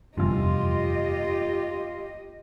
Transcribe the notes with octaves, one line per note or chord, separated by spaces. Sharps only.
F1 E2 G2 F4 G4 D#5